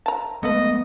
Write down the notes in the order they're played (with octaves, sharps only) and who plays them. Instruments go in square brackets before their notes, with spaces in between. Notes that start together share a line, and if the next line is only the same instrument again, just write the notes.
[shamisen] A5 A#5
[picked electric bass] G#3 A3 B3 [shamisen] A4 B4 [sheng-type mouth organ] D#5